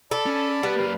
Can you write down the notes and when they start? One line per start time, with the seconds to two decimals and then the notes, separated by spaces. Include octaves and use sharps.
0.11 A4 D5 A5 B5
0.26 C#4
0.63 G3 B4 F#5
0.76 F#2 A#3 B4